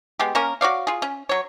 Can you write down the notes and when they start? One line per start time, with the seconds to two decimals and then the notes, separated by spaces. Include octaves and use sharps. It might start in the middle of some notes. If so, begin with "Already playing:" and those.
0.19 G#3 B3 G4
0.35 A#3 C#4 A#4
0.61 F#4 C#5 D5 F5
0.87 F4 G#4
1.02 C#4
1.29 F#3 C#5